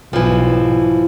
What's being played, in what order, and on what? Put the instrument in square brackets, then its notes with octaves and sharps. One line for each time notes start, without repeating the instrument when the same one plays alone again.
[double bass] B1 G#2 [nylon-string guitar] E3 F3